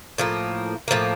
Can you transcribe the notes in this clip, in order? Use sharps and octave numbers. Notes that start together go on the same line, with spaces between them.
A2 F3 A#3
A2 F3 A#3